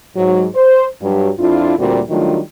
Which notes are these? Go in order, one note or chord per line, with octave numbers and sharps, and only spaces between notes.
G#2 F#3
C5
G2 F#3 G3
F2 D4 E4 F4
D2 A#2 G3 A#3 C4 F#4
D#3 F#3 G3 A3 D4 F4